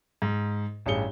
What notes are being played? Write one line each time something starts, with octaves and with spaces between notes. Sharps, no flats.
G#2
A1 G2 G#4 C#7 G7